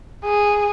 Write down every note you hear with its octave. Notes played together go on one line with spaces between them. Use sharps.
G#4